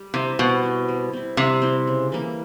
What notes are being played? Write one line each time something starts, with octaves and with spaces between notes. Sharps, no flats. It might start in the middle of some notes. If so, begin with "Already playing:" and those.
Already playing: G3
C3 C4 E4
B2 G3
C4 E4
G3
C4 E4
C3 G3
C4 E4
C#3
E3 G3 A#3